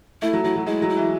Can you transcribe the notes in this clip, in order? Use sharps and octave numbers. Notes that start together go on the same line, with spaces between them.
A3 E4
F#3
F#3 E4
F#3
G#3 E4
F#3
E4
E3